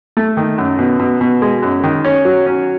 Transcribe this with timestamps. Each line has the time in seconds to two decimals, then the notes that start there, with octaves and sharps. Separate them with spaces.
0.17 A3
0.37 D#3
0.58 F#2
0.79 B2
0.99 B2
1.21 B2
1.42 G#3
1.62 F#2
1.83 D#3
2.05 C#4
2.25 F#3
2.46 C#4